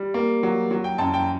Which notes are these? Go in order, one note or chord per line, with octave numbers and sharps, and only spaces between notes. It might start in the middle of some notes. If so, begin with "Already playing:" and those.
Already playing: G3
A#3
F#3
F#3
G5
F#2 A5
G5